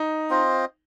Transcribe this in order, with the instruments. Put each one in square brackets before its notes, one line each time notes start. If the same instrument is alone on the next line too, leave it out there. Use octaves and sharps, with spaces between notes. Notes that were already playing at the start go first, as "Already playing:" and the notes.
Already playing: [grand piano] D#4
[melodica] C4 F4 C5 D#5